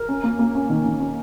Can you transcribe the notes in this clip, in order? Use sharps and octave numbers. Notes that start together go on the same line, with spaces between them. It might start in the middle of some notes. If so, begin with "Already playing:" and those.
Already playing: A#4
C#4
A#3
A#3
C#4
D#3
D#3
C#4